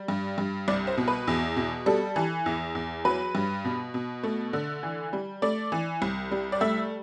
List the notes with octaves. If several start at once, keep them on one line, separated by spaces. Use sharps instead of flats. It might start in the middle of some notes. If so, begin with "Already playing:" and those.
Already playing: G3
G2
G2
C2 D5
C5
B2
B4
E2
B2
G3 A4
E3
E2
E2
F#3 B4
G2
B2
B2
A3
D3
E3
G3
A3 D5
E3
C2
G3
D5
A3 E5